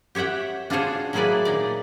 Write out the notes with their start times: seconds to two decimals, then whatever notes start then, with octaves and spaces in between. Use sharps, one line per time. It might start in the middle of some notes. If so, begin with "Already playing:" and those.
0.15 G4 C#5 E5 F#5 G5
0.70 D4 F4 F#4 G#4 C5 C#5
1.13 F#3 A#3 E4 G#4 B4 D5
1.45 A#2 D#4 D5